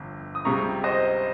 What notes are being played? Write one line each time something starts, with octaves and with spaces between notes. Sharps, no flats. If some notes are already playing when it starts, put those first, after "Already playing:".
Already playing: G1 F2
D#6
C#2 C3 G3 A#5 C#6
C5 D#5